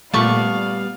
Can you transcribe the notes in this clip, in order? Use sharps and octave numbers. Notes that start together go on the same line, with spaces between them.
A#2 G3 A3 B3 D5 F5 A5 C#6